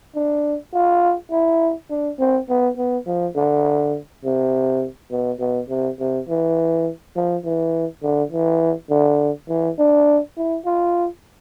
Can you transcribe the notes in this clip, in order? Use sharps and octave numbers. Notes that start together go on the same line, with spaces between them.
D4
F4
E4
D4
C4
B3
B3
F3
D3
C3
B2
B2
C3
C3
E3
F3
E3
D3
E3
D3
E3
D4
E4
F4